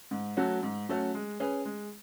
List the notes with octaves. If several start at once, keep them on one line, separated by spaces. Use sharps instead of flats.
G#2
F#3 A3 C#4 F#4
G#2
F#3 A3 C#4 F#4
G#3
C#4 G#4 B4
G#3